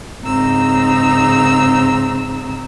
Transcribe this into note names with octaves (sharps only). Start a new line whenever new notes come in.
G#2 C#3 C4 D#4 A#5 E6